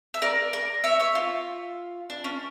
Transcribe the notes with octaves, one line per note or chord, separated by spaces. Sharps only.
E5
A#4 D5
A#4 D5
C#5 E5
C#5 E5
F4
D4
C#4